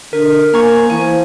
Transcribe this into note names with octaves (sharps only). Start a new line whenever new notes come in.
D3 A#4
A#3 G#4 C5 C#5 A#5 C#6
E3 F3 G#5